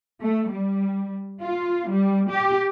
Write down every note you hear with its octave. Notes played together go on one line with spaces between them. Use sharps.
A3
G3
F4
G3
G4